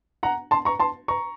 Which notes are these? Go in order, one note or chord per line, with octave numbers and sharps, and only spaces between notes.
F#5 A#5
A5 C6
A#5 C#6
A5 C6
A#5 C#6